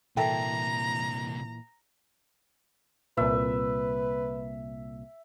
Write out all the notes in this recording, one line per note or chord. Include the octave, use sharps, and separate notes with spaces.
C2 A#2 E3 A#3 A4 E5 G5 A#5
C2 A#2 B4 E5